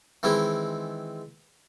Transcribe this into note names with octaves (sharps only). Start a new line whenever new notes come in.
D#3 E3 G#3 C4 E4